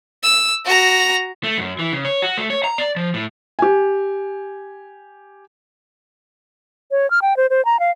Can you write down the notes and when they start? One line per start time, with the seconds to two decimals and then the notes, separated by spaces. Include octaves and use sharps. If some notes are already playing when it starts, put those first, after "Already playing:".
0.23 E6
0.65 F#4 A#5
1.44 A3
1.58 F#2
1.79 E3
1.93 C#3
2.05 C#5
2.22 F#4
2.37 A3
2.50 C#5
2.64 A#5
2.78 D5
2.96 F3
3.14 A2
3.59 G4 G#5
6.91 C#5
7.11 F6
7.22 G5
7.37 C5
7.50 C5
7.65 A#5
7.80 F5